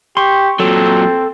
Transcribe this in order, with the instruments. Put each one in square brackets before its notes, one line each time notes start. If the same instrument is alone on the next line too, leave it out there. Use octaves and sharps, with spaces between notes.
[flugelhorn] G4 [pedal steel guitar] C6 C#6
[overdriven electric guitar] A#2 F#3 [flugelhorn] C4 [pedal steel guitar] A4